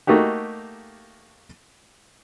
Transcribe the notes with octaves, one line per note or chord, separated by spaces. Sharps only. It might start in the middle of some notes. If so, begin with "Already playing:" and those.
A3 A#3 D#4 F#4 G4